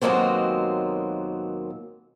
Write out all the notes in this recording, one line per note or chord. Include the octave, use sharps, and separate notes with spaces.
D#2 B2 F#3 G#3 A#3 C4